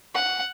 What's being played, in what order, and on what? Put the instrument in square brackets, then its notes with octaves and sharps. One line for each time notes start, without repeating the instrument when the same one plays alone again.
[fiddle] F#5